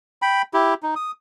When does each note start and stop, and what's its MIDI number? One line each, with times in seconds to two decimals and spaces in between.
0.22 0.42 79
0.22 0.42 83
0.54 0.74 64
0.54 0.74 67
0.83 0.94 63
0.96 1.12 87